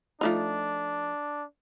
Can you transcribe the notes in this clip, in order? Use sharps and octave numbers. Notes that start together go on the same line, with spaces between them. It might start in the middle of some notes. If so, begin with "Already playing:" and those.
F3 A3 D4 D#4